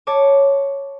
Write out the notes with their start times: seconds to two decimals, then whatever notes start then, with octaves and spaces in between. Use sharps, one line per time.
0.07 C#5 A5 D6